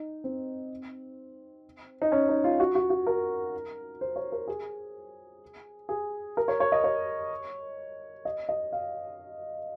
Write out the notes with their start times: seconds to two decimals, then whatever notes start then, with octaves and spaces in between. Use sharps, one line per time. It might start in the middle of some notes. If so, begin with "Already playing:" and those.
Already playing: D#4
0.24 C4
2.02 D#4
2.12 C#4
2.28 D#4
2.44 F4
2.60 F#4
2.75 F#4
2.90 F#4
3.07 A#4
4.01 C5
4.16 C#5
4.32 A#4
4.48 G#4
5.89 G#4
6.37 A#4
6.48 C#5
6.60 C#5
6.72 D#5
6.84 C#5
8.25 D#5
8.49 D#5
8.73 F5